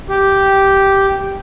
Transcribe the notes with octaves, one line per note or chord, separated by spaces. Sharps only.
G4